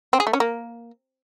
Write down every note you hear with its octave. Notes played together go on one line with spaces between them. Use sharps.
C4
G#4
A3
C#4
A#3